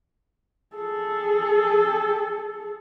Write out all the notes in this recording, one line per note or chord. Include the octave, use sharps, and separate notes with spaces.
G#4 A4